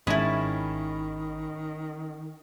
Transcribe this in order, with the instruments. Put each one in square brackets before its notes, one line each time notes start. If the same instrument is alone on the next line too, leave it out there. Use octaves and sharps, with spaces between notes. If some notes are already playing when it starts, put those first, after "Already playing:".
[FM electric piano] G#1 B5 [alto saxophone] D#3 [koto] G#3 E4 [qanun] C#4 A5